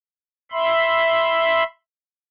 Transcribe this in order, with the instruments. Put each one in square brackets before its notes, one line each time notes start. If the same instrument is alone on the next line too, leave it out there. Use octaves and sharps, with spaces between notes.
[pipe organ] E5 B5 C6